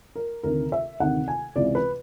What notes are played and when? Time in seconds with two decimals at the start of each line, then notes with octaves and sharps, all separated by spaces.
0.16 A#4
0.43 D2 C3 D#3 A#4
0.72 E5
1.00 D2 C3 D#3 F#5
1.28 G#5
1.56 C#2 C3 E3 D5
1.75 B4